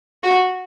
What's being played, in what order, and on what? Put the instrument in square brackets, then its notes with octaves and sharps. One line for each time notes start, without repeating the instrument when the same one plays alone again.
[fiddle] F#4